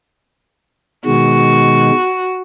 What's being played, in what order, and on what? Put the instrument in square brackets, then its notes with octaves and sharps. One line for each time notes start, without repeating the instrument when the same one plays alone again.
[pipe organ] B2 D#3 G#3 [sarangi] F#4